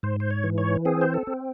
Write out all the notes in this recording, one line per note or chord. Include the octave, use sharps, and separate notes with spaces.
G#2 C5
C5
C#5
E3
C#5
C4 G#4
C5
A4
C4